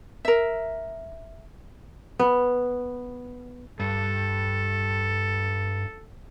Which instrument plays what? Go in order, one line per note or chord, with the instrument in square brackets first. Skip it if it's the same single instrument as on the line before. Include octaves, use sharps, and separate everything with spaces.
[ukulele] A#4 E5
[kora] B3
[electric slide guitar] G2 [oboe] A4